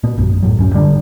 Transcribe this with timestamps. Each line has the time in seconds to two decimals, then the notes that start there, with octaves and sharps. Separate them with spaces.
0.03 A#2 B3
0.17 A#1 F#2
0.43 D#1 C#2 A2 F#3
0.57 D1 F#2 C#4
0.73 G#1 D3 G3 D4